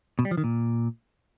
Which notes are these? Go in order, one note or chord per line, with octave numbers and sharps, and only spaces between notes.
B2
G3
F3
D#3
A#2